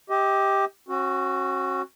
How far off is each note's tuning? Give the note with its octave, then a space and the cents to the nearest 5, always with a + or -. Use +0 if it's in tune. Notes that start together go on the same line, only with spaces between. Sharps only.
G4 +5 D#5 +40
C#4 -40 F#4 +0